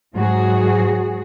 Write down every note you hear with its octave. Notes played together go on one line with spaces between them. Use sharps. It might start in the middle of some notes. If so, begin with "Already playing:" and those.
G#2 F#3 F#4 G#4